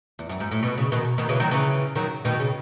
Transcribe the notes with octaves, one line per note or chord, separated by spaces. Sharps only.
E2
F#2
G#2
A2
B2
C#3
B2 D#3
B2 D#3
C#3 E3
D#3 F#3
C#3 E3
D#3 F#3
B2 D#3
C#3